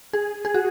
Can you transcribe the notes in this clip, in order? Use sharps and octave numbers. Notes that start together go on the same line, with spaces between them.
G#4
G#4
F#4